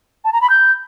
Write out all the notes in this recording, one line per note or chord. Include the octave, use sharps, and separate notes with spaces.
A5
A#5
B5
G6